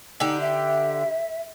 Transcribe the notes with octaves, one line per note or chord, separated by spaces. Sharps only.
D3 D#4 G4
E5